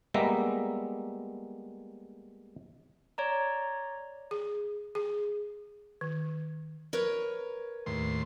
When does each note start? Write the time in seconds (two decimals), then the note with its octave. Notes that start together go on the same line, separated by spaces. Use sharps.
0.14 G3 G#3 A#3 B3 E5 A#5
3.18 C#5 D5 A#5
4.31 G#4
4.95 G#4
6.01 D#3
6.93 A#4 B4 C#5
7.86 D#2 A2 C6